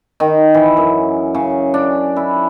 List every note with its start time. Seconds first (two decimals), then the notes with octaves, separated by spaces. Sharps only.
0.20 D#3
0.54 E3
0.77 F#2
1.34 C#3
1.74 D4
2.16 E4